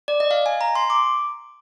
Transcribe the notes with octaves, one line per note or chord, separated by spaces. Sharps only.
D5
D#5
F5
G#5
A#5
C6
D6